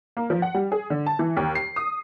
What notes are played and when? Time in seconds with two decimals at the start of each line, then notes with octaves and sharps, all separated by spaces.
0.17 A#3
0.30 F3
0.42 F#5
0.54 G3
0.72 G#4
0.90 D3
1.06 A5
1.19 E3
1.37 D#2
1.55 C7
1.76 D#6